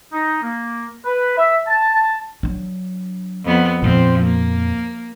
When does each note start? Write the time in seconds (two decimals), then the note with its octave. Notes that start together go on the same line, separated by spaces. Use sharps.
0.13 D#4
0.43 A#3
1.05 B4
1.38 E5
1.67 A5
2.43 F#3 D4
3.44 F2 B3
3.82 F2 A#2 F3 C4
4.23 A#3